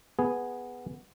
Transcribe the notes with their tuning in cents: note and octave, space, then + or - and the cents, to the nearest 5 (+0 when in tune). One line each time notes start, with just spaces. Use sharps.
B3 +0 G#4 +0